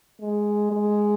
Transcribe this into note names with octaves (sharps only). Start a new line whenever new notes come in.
G#3
G#3